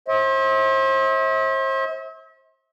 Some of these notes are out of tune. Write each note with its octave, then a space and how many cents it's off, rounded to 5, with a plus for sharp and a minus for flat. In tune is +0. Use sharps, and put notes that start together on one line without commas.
C5 +35 E5 -40